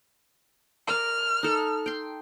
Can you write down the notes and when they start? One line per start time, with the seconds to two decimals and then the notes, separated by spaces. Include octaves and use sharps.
0.88 A#4 D5 F6
1.43 D#4 A4
1.86 G5 C6